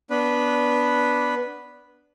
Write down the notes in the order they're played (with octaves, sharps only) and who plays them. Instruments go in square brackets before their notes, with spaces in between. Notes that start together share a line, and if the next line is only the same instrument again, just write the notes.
[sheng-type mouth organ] B3 D4 B4